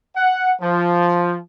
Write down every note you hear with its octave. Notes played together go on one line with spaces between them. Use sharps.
F#5
F3